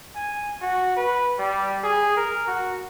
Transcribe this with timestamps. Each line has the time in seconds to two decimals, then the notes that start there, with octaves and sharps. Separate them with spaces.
0.15 G#5
0.61 F#4
0.96 B4
1.39 G3
1.84 G#4
2.17 A#4
2.47 F#4